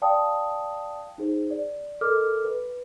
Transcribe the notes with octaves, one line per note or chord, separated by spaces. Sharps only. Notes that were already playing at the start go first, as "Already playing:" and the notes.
D5 F5 G5 A5 D#6
D#4 G#4 C5
D5
A4 A#4 D#5 D6 F6
B4